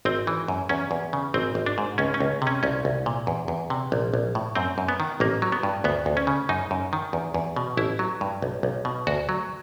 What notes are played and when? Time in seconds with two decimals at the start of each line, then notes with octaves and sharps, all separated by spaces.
0.05 G#1 C4
0.27 E3
0.48 F#2
0.69 E2 C#4
0.91 E2
1.13 C#3
1.34 G#1 C4
1.55 G#1
1.66 D4
1.78 G#2
1.98 C#2 C#4
2.14 C#4
2.20 C#2
2.42 C3
2.47 C#4
2.63 C2 C#4
2.85 C2
3.06 A#2
3.27 E2
3.48 E2
3.70 C3
3.92 A#1
4.14 A#1
4.35 A2
4.56 F#2 C4
4.78 F#2
4.89 B3
5.00 D#3
5.20 A1 A#3
5.42 F#3
5.52 B3
5.63 G2
5.84 D2 B3
6.06 D2
6.17 C#4
6.27 C#3
6.49 F#2 D#4
6.71 F#2
6.93 D#3
7.13 E2
7.34 E2
7.56 B2
7.77 A1 E4
7.99 F#3
8.21 G2
8.42 B1
8.63 B1
8.85 B2
9.07 D2 F#4
9.29 F#3